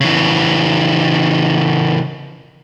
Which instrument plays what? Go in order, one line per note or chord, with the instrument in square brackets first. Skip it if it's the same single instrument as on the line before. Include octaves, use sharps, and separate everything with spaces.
[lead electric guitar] C#3 E3